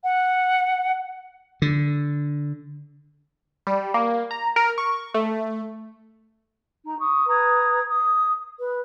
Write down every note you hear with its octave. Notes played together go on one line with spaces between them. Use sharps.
F#5
D3
G3
A#3
A#5
A#4
C#6
A3
D#4 A#5
C#6 D#6
B4 A#5 D#6 G#6
D#6
B4